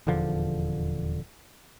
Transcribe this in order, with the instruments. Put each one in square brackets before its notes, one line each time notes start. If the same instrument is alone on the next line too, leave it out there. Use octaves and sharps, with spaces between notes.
[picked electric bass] D#1 E2 D3 F3